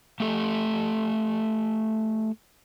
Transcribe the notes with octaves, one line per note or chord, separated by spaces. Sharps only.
A3 G4 A4